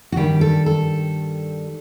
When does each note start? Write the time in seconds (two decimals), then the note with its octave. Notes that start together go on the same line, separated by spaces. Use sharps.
0.12 F#4
0.16 G2 D#3 G3 G4
0.41 A4
0.66 A4